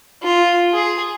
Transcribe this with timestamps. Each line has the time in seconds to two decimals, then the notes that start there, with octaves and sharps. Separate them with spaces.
0.23 F4
0.74 G#4